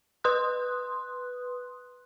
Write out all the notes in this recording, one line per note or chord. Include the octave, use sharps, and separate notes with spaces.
B4 C6 D#6 F#6